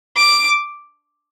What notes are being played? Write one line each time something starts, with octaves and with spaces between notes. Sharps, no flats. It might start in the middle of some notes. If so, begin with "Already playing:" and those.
D6